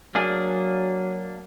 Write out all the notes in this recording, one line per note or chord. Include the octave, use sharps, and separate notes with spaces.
F#3 A#3 D4 G#4